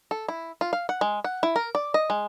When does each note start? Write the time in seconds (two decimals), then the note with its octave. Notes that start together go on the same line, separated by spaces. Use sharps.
0.11 A4
0.28 E4
0.61 F4
0.73 F5
0.89 F#5
1.01 G#3
1.24 F#5
1.43 E4
1.56 A#4
1.75 D5
1.94 D#5
2.10 G#3